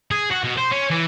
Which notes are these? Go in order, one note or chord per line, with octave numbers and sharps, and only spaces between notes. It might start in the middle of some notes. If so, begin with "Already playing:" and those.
G#4
F#4
B2
C5
C#4
E3